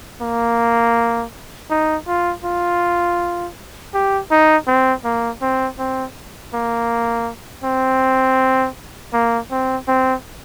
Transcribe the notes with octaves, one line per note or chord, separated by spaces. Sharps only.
A#3
D#4
F4
F4
G4
D#4
C4
A#3
C4
C4
A#3
C4
A#3
C4
C4